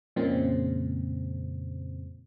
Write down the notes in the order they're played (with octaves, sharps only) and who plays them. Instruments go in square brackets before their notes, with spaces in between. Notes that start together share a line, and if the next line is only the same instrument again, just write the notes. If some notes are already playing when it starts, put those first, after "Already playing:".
[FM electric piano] F2 A#2 C#3 G#3 C4